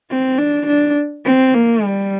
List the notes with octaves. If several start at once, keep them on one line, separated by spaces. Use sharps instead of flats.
C4
D4
D4
C4
A#3
G3